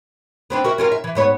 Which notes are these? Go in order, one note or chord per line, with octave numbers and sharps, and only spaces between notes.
B3 C4 D4
F#4 A#4 E5
C#4 F4 A#4
E5
E3
G#2 B3 C#5